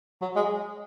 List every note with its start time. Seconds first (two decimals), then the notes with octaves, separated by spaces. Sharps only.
0.22 F#3
0.36 G#3